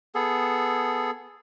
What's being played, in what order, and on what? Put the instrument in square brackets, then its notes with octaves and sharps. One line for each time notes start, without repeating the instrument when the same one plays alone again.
[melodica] B3 G#4 A4